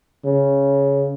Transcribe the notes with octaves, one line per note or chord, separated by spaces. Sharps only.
C#3